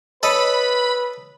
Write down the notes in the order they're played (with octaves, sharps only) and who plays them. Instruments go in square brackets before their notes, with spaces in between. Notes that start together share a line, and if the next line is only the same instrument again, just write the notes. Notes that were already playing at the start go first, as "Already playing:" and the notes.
[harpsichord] A4 D#5 [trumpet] B4 [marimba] C#5 [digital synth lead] B5